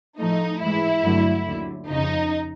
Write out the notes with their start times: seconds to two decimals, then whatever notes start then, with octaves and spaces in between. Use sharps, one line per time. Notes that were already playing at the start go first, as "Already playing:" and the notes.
0.19 A2 F3 A3 D#4
0.61 G#2 E3 G#3 E4
1.04 G2 D3 F#3 A3
1.47 D#2 D3 F#3
1.88 F2 C#3 F3 D#4